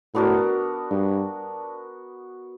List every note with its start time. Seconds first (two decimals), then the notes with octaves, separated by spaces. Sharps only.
0.14 A2 B3 D4 F#4 A#4
0.91 G2